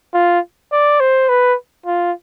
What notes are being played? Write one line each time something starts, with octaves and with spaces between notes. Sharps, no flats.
F4
D5
C5
B4
F4